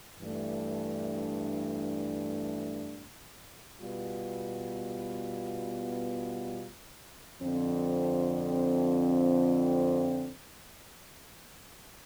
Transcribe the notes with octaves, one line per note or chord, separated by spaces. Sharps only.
G2 E3 A3 D4
B2 G3 B3 F4
F2 D3 F3 C4